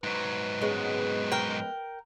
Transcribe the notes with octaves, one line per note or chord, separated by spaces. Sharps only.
G#2 F#3 B4
G#3 B3 C#4
A#4 G5